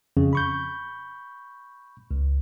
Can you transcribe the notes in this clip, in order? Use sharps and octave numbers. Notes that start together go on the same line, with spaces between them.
F2 C#3
B5 C#6 G6
C#2